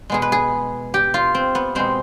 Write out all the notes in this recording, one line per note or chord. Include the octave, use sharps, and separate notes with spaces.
B2 G#3 B3 G#4
B4
G#4
G4
F4
C4
B3
B2 G#3 B3 C4